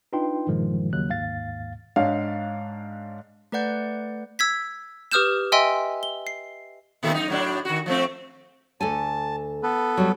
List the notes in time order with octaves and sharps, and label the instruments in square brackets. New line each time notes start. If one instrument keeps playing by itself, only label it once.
[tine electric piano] D4 D#4 F4 B4 G5 C6
G2 A#2 D#3 F3 G#3
D#2 C#3 F#3 F#6
D#2 G#2 F5 A6
[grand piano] G#2 D4 C#5 F5
[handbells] A3 B4 D5 F#5 G6
[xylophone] E6 G#6 B6
G4 B4 D#6 F6 G6 E7
D#5 E5 G5 G#5 C6 E6
G7
C7
[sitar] A#2 D#3 A4
F#2 D#4
A2 F#3 D4
D#3 F#4
F3 A3 C4
[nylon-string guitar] D2 A4 G#5 [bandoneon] A5
[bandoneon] B3 A4 B4
[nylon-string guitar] F#3 G3